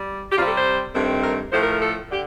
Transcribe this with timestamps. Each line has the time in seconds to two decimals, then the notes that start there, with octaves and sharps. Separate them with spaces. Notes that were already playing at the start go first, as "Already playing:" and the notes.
Already playing: G3
0.32 G4
0.37 C3 G3 C4 F4
0.47 A4
0.56 C5
0.94 G2 D#3 A3 C4
1.23 A#4
1.52 A2 F3 A3 C5
1.61 A#4
1.72 A#4
1.81 A4
2.11 D3 G4